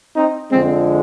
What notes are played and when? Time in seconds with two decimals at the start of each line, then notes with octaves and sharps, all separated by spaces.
0.16 C4 D#4
0.52 F2 D3 F3 G#3 C4